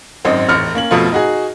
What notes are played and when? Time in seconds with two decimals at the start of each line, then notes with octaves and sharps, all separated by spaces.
0.25 G#1 F#2 C4 D#5
0.49 E1 A1 F6
0.75 A#3 C#4 F#7
0.91 F2 B2 F3 A3 F4
1.12 D#4 F#4 G#4